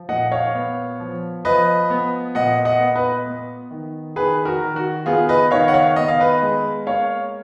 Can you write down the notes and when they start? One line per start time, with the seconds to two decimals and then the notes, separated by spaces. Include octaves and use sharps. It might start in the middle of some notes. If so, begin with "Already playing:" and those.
Already playing: F3
0.09 A#2 D#5 F#5
0.32 C#5 F5
0.55 B3
1.00 F3
1.45 F3 B4 D#5
1.90 B3
2.35 A#2 D#5 F#5
2.65 D#5 F#5
2.80 B3
2.96 B4 D#5
3.26 B3
3.71 D#3
4.16 D#3 G#4 B4
4.45 F#4 A#4
4.60 D#3
4.76 F#4
5.06 B3 F4 G#4
5.29 B4 D#5
5.51 D#3 C#5 F5
5.68 F#5
5.74 C#5 F5
5.96 B3 D#5
6.08 F5
6.20 B4 D#5
6.42 G#3
6.87 A#3 C#5 F5